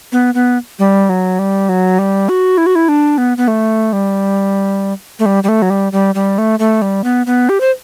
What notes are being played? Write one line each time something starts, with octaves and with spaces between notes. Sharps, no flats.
B3
B3
G3
F#3
G3
F#3
G3
F#4
E4
F#4
E4
D4
B3
B3
A3
G3
A3
G3
G3
A3
F#3
G3
G3
G3
A3
A3
G3
B3
B3
G4
C5